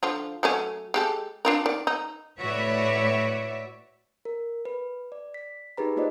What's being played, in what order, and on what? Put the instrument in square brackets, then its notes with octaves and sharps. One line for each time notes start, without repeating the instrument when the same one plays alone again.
[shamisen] D3 F3 F4
F#3 A3 C#4
G#3 G4 A4
D4 F4 A#4
D#3 D5
D#4
[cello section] A2 F#4 B4 C#5 D5 E5
[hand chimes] A#4
B4
D5
B6
D#4 G4 G#4 B4 A#5
A#3 D#4 F4 C5 D5 D#5